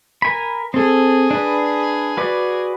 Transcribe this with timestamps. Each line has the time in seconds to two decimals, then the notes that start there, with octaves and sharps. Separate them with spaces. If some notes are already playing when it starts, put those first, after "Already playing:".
0.22 A#4 G#5 B5
0.74 C4 G#4 A4
1.31 D4 B4
2.17 F#4 B4 D5